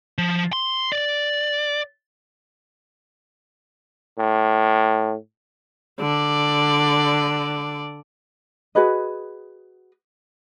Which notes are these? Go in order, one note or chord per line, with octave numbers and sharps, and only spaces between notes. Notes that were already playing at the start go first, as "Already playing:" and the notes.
F3
C6
D5
A2
D3 D5
F#4 G#4 B4 D#5